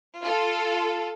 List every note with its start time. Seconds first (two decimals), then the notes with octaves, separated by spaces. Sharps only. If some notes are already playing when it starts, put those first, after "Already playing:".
0.23 F4 A4